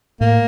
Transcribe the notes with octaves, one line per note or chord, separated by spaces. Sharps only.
A2 A#3